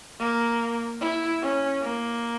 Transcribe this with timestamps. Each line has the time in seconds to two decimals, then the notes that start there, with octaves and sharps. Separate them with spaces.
0.20 A#3
1.01 E4
1.41 C#4
1.82 A#3